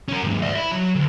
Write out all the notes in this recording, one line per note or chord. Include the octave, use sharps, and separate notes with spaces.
C#4 A#4
D#2 G#2
D5 E5
E4
F#3
D2